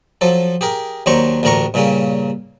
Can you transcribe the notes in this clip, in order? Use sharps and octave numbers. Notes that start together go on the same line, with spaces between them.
F3 F#3 A4
G4 G#4 A#4
D#2 F#3 D4 C5 A#5 C#6
A1 D2 D4 A#4 A#5 C#6
G2 A#2 C#3 A#3 C#4